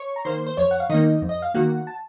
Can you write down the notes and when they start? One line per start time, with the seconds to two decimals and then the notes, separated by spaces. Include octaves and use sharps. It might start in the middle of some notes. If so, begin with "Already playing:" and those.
Already playing: C#5 C#6
0.16 A#5
0.25 D#3 A#3 C5 C6
0.47 C5
0.57 F2 C#5
0.71 F#5
0.80 F5
0.89 D#3 A#3 D#4 D#5
1.22 F2
1.29 D#5
1.42 F5
1.54 D#3 A#3 F#4 F#5
1.87 A5